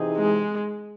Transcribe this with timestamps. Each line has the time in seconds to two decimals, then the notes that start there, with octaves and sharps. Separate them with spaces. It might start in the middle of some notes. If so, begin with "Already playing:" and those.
Already playing: C3 E3 C4 D#4 G#4
0.16 G#3